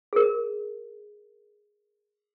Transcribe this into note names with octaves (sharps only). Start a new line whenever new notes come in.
G#4 A#4